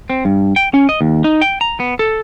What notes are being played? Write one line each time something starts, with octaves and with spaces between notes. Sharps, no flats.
C4
G2
G5
C#4
D#5
D#2
D#4
G5
A#5
B3
A4